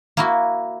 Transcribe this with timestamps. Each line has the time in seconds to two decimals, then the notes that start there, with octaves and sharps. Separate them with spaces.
0.17 A#3 E4 F#4